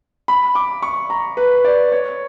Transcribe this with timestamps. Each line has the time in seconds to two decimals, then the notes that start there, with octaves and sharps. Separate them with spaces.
0.28 B5
0.55 D6
0.82 C#6
1.10 A#5
1.37 B4
1.64 D5
1.92 C#5